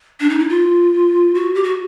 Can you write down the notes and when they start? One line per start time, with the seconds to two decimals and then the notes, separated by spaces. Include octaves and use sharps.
0.20 D4
0.30 D#4
0.39 E4
0.49 F4
1.35 F#4
1.55 G4
1.64 F#4